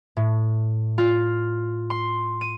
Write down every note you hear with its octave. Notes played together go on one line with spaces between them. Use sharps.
A2
F4
C6
D#7